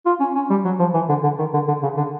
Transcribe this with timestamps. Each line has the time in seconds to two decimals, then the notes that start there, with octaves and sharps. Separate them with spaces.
0.06 F4
0.20 C#4
0.35 C#4
0.50 G3
0.65 F#3
0.79 F3
0.94 E3
1.09 D3
1.23 D3
1.39 D#3
1.54 D3
1.68 D3
1.83 C#3
1.97 D3